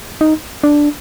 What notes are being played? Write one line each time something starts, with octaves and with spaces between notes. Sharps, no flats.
D#4
D4